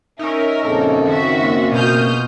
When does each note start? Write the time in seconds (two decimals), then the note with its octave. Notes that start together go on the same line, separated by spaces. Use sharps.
0.19 C#4 D#4 A#4 E5
0.64 A#1 F#2 C#3 A#3 C4 A4
1.05 D#3 F#4 E5
1.40 A#3 C#4 F4
1.72 B2 D#6 F6 G6